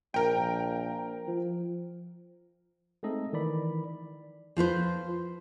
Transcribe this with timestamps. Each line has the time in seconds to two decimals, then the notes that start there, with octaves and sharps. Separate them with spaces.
0.14 A#1 A#4 G5
1.28 F3
3.03 G#3 A3 C4 D#4 A4 D#5
3.33 D#3 E3 D5 B5
4.57 F3 F4 B4 C5